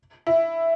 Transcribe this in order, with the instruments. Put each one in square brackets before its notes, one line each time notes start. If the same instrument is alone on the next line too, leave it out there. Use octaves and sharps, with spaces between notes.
[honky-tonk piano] E4